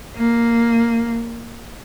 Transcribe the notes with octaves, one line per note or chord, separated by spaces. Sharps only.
A#3